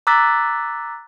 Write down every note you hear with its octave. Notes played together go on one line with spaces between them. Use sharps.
A#5 D6 E6 F#6 A6 B6